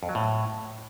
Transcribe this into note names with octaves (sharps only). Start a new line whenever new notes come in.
F2
F#3
A2